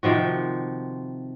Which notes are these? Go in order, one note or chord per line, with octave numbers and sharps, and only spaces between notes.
C3 D#3 F3 F#4